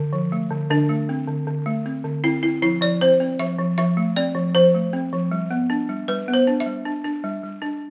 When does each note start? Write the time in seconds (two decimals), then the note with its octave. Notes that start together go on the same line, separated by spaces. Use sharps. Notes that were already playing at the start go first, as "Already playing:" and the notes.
Already playing: D3
0.13 F3
0.32 A3
0.50 D3
0.70 D3 D4
0.89 A3
1.09 C4
1.28 D3
1.47 D3
1.66 A3
1.86 C4
2.05 D3
2.24 C4 E4
2.43 C4 E4
2.62 F3 E4
2.81 F3 D5
3.01 C4 C5
3.20 C4
3.39 F3 E5
3.59 F3
3.78 F3 E5
3.97 A3
4.16 C4 D5
4.35 F3
4.55 F3 C5
4.74 A3
4.93 C4
5.13 F3
5.31 G3
5.51 B3
5.70 D4
5.89 G3
6.08 G3 B4
6.28 B3
6.34 C5
6.47 D4
6.60 E5
6.66 G3
6.85 D4
7.05 D4
7.24 G3
7.43 G3
7.62 D4